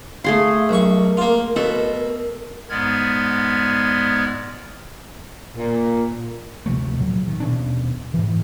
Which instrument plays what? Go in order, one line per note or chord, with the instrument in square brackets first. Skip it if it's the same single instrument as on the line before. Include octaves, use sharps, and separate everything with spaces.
[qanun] A3 G#4 C6 [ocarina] F5
[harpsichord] B1 C#6 [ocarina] A#4
[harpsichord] A#3 F4
[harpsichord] B2 [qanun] A4
[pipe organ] G#2 G#3 B3 D5 F6 G#6
[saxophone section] A#2
[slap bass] D2 C3 F3 A3
A#2 F#3
D#3
D#1 B2 C#4 D4
G#2 E3